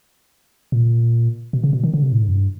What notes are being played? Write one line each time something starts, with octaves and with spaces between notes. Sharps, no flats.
A#2
B2
C#3
B2
D#3
D3
C3
A2
G#2
F#2
G2